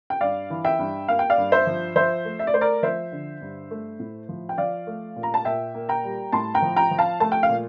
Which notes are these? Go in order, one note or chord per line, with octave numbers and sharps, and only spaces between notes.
G5
G2 D5 F5
E3
E5 G5
G2
A#3 F5
G5
D5 F5
G2
C5 E5
F3
F3 C5 E5
A3
E5
D5
A3 C5
A#4 D5
F3 C5 E5
D3
G2
A3
A2
F3
G5
F3 D5 F5
A3
A#2
A#5
A5
A#2 E5 G5
A#3
G5 A#5
G3
A2 A5 C6
G5 A#5
F3
G5 A#5
F3
F5 A5
A3 A5
G5
F5
A#2